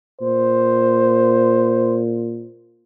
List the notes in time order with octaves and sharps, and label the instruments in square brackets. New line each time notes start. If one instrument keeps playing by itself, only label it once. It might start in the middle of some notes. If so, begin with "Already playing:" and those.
[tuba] A#2 [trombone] C5